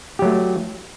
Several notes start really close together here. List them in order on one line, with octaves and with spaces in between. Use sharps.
G4 F#3 A3